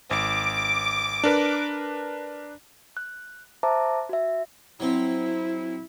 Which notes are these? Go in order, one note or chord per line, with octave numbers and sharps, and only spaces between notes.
G#1 D6
D4 A#4 B4
F#6
C5 E5 A5 A#5 D6
F#4 E5
F#3 C4 E4